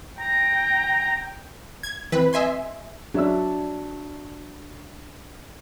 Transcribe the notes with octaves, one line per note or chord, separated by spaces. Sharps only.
G5 A#5
G#6
E3 C4 B4
D#5 E5 G#5 C6
F#3 D4 E5 E6